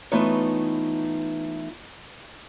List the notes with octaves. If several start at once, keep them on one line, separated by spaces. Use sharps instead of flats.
E3 A3 B3 D#4 F4 C#5